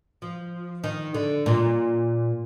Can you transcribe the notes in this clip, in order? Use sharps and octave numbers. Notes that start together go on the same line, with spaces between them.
F3
D#3
D3
A#2